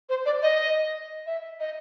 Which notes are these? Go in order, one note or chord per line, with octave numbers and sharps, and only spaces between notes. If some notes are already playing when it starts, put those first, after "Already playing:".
C5
D5
D#5
E5
D#5